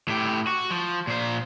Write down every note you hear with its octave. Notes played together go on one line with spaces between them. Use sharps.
A2 G4
F#4
F3
A#2 C5